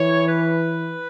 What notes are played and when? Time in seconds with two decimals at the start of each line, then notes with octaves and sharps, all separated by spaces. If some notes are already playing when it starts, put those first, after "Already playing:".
Already playing: E3 C#5
0.27 B4